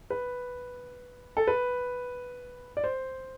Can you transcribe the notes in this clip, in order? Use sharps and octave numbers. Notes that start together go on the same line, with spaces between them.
B4
A4
B4
D5
C5